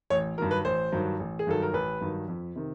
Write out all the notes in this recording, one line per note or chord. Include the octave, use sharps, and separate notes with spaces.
A1 C#5
G2 D#3 F#3 A#4
B4
A1 C5
G2 D#3 F#3
A1
G#4
G2 D#3 F#3 A4
A#4
A1 B4
G2 D#3 F#3
F2
C3 D#3